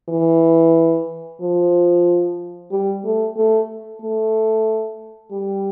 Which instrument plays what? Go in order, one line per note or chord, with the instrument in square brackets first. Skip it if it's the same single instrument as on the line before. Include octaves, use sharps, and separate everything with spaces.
[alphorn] E3
F3
G3
A3
A3
A3
G3